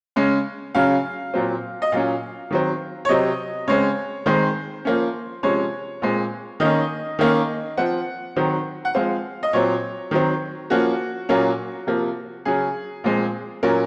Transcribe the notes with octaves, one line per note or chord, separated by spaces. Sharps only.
C#3 G#3 C#4
C#3 F#3 C#4 F5
A#2 F#3 C4
D#5
A#2 F#3 C#4 F5
D#3 F#3 C4
C#5
C3 F#3 C4 D#5
C#3 G#3 C4 C#5
D#3 G#3 C4 C5
F3 A#3 C#4
C3 F3 G#3 C#4 C#5
A#2 G#3 C4
D#3 A#3 C#4 D#5
D#3 A#3 C#4
F3 C4 F#5
D#3 F#3 C4
F#5
F3 G#3 C4 F5
D#5
A#2 F#3 C4 C#5
D#3 F#3 C4
F3 A#3 C#4 F#4
A#2 F#3 A#3 C#4
C3 F3 A#3
C#3 F#3 C#4 G#4
A#2 F3 G#3 C4
A#2 F#3 C#4 A#4